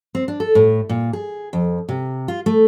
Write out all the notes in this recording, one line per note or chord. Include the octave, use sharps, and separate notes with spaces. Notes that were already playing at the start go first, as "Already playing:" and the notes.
C4
D4
A4
A2
A#2
G#4
F2
C3
F4
A3